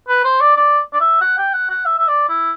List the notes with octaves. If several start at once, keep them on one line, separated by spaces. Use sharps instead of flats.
B4
C5
D5
D5
D5
E5
F#5
G5
F#5
F#5
E5
E5
D5
E4